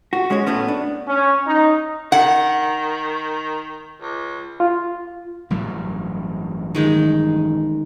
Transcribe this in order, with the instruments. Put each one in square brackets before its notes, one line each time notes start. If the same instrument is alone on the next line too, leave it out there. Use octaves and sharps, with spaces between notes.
[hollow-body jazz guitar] F#4
G#3 C#4 F#4 C#5
A2 A3 B3 C#4
D4
[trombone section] C#4
D#4
[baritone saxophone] D#3 [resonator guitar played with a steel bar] F#5
[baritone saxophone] C#2
[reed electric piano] F4
[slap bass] A1 G2 F#3
[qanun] D#3 G#3 D#4